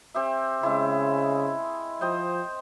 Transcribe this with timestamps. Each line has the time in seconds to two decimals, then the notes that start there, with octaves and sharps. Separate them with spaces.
0.14 C4 G4 E5
0.63 C#3 G#3 E4
2.01 F3 C5 D#5 G5